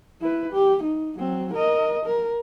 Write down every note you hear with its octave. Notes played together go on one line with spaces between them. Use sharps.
E4 B4
G4
D#4
F#3 C4
A#4 D#5
A#4